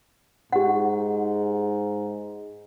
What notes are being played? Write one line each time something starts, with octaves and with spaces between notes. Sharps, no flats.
G#2 G4 F#5